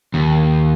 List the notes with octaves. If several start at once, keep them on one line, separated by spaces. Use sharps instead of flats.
D#2